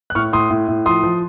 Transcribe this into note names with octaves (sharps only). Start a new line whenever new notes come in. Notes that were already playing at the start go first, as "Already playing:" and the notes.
F#6
A2 C#6 F6
A2 C6 D#6
A2
A2
F3 C6 D#6
F3